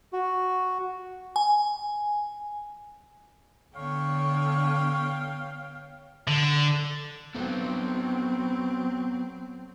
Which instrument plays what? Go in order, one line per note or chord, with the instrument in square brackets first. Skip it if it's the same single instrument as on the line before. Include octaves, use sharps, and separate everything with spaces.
[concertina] F#4
[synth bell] G#5
[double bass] D3 [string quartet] B3 C#5 G5 [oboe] F5 [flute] C#6
[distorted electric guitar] D3
[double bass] F#3 C4 [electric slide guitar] B3 A4 B4